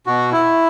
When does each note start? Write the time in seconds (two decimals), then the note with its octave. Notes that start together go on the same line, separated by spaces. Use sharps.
0.07 B2 F#4
0.32 E4